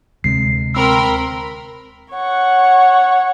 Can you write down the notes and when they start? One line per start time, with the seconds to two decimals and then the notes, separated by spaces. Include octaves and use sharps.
0.24 D2 C3 G#3 C7
0.75 C4 A#4 B5 C6 E6
2.13 C#5 F#5